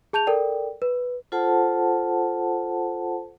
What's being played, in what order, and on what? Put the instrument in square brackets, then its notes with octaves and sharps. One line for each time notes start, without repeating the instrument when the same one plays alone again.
[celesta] G#4 A5 G6 F7
A4 A#4 D5 G5
B4
[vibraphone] F4 A4 C5 F#5 A5